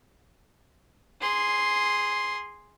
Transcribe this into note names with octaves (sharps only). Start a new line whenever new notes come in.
G#4 C6